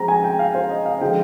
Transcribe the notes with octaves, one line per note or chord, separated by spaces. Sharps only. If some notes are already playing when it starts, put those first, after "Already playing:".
Already playing: F3 G#3 C4 A#5
G#5
G5
F5
C5
D#5
F5
D3 F3 G#3 G5